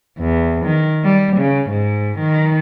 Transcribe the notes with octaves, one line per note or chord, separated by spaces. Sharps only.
E2
D#3
G3
C#3
G#2
D#3